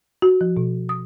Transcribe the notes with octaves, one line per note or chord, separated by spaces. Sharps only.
F#4
F3
B2
D#6